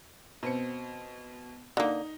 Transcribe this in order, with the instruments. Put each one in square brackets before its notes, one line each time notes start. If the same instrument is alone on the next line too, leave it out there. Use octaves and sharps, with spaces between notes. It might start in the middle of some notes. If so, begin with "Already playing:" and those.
[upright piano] B2 C4 C#7
[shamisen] D3 A#3 [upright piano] D#4